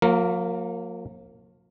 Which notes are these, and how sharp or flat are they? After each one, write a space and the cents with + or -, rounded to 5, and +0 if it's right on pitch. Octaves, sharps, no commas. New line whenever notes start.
F3 +45 A#3 -15 A#4 +0